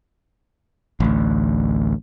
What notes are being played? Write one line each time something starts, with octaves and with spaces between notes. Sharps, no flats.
A1 D2